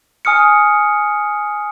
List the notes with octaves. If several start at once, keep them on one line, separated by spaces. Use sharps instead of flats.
G#5 D#6 F6 C#7